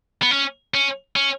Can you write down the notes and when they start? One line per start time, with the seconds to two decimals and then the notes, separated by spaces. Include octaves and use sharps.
0.22 B3
0.31 C#4
0.74 C#4
1.16 C#4